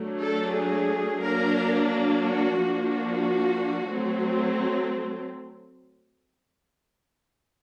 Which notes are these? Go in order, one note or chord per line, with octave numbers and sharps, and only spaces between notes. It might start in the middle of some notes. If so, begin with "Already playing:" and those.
Already playing: F#3 A3 D4
A4
G#4
F#3 A#3 D4 A#4
F#4
F3 A#3 D4
F#4
F#3 A3 C4